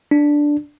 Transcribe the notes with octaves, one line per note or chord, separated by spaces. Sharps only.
D4